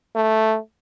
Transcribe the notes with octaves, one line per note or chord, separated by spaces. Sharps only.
A3